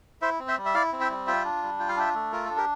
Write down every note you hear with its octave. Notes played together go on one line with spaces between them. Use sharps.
E4 C5 E5
C4
C5 E5
G3
E5
E4 D5 F5
C4
E5 G5
G3
F4 E5 G5
D4
G3
F4 G5
F5
D4 E5 G5
A3
F4 A#4
D4 A4
G4 A#4